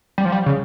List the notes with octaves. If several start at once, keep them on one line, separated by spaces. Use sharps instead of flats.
G3
F3
G3
C#3